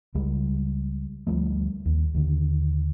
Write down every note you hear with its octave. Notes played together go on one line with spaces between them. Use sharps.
C#2 G3 G#3
D2 F3 G3 A3
D#2
D#2 D3